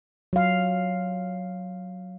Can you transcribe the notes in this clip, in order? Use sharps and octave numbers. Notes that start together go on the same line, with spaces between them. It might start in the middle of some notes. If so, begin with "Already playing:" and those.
F#3 F5